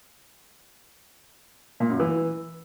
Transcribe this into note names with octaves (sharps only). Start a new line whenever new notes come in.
A#2
F#2
E3